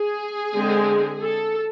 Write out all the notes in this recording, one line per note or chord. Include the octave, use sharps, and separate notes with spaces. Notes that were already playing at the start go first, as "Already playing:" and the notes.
Already playing: G#4
D3 G#3 C4
A4